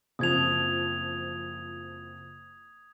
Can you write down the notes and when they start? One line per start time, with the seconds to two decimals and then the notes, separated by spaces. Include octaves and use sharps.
0.19 F#1 F3 C4 D#6 G#6 F7